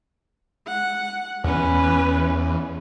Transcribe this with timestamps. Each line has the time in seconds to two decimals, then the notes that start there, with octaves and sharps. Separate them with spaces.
0.67 F#5
1.44 E2 C#4 B4